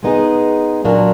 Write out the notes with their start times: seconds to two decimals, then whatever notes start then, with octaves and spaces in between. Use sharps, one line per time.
0.03 G#3 B3 D#4 G#4
0.85 A#2 F#3 A#3 D4